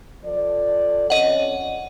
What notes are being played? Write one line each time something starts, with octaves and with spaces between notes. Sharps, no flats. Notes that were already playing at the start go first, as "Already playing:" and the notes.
F3 A4 D5
F2 C#4 C#5 D#5 F#5